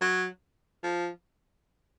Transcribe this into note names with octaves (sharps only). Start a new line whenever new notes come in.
F#3
F3